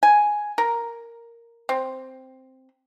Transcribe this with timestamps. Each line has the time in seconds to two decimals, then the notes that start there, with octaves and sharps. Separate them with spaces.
0.03 G#5
0.58 A#4
1.69 C4